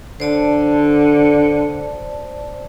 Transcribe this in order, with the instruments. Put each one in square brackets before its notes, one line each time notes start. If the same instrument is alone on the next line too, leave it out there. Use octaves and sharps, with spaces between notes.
[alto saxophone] D3 [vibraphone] C5 D5 A5